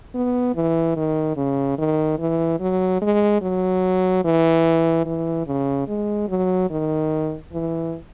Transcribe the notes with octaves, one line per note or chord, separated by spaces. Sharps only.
B3
E3
D#3
C#3
D#3
E3
F#3
G#3
F#3
E3
E3
C#3
G#3
F#3
D#3
E3